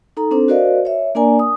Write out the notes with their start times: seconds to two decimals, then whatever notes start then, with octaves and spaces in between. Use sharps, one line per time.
0.17 D#4 A4 A#5
0.31 C4 D4 A4 C5
0.48 F#4 A#4 C5 D5 D#5 F5
0.85 C#5 E5
1.15 A#3 D4 A#4 D5 G#5 A#5
1.39 D#6